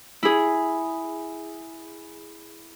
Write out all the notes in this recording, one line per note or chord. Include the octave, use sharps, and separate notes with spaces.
E4 G#4